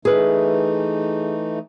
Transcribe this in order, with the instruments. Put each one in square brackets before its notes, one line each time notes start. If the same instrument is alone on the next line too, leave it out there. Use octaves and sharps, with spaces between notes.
[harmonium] E3 A3 D#4 [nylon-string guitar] G#4 B4